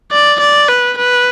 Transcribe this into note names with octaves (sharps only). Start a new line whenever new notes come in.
D5
D5
B4
B4